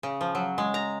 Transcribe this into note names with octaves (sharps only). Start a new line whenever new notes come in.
C#3
F3
F#3
G#3
A#5